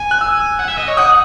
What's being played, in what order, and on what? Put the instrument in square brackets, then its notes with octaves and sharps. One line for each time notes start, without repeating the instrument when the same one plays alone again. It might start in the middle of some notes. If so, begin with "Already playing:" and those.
Already playing: [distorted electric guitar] G#5
[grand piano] F#6
E6
[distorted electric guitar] F#5
E5
D#5
C#5
[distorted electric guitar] F#5 [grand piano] D#6